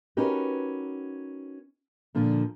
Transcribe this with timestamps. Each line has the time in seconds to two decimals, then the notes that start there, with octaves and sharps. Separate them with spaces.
0.17 C#4 D#4 F#4 G4 A#4 B4
2.15 A#2 D3 F3